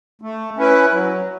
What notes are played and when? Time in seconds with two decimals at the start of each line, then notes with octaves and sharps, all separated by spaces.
0.22 A3
0.57 C#4 E4 B4
0.92 F#3